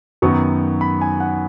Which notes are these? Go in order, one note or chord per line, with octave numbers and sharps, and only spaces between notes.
F#2 D#3 F#3 B3 D#4 C#6
B5
G#5
F#5